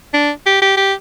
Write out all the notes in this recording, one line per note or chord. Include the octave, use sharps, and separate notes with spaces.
D4
G4
G4
G4